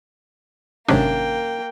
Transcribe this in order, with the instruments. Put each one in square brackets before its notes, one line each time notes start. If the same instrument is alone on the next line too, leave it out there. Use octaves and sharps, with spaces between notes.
[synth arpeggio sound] G#1 C3 D4 [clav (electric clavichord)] F#2 D#3 C#4 [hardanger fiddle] A#3 G5